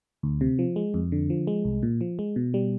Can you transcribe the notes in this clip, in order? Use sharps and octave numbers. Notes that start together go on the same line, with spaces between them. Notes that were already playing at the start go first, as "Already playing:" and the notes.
D2
C3
F3
G#3
F2
D3
F3
G#3
C2
A#2
F3
G#3
B2
G3